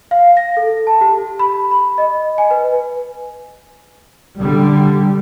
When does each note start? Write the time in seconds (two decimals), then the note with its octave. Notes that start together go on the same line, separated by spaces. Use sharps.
0.11 F5
0.37 A#6
0.57 A4
0.87 A5
1.01 G4
1.39 B5
1.71 B5
1.98 D#5
2.38 G#5
2.51 B4
4.39 D3 G3